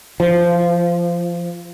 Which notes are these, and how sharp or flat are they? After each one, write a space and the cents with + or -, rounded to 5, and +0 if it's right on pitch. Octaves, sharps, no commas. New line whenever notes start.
F3 -15